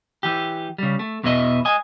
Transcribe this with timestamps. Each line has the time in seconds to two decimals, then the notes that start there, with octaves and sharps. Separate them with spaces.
0.23 E3 G4
0.78 C#3 G3
0.99 A3
1.23 E2 B2 E3 E4 D#5
1.65 D#5 G#5